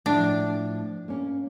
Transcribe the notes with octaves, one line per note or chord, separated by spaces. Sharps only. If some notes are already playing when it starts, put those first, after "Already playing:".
A2 F3 D4
A#3 C#4